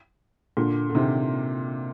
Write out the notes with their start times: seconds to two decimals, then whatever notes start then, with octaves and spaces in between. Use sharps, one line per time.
0.57 A#2 D3
0.90 D3
0.95 C3 D#3